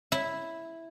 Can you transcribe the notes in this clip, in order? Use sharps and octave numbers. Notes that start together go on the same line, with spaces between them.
E4